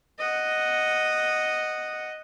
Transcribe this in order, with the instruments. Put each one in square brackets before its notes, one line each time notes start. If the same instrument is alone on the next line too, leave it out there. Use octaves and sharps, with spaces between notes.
[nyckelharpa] D#5 F#5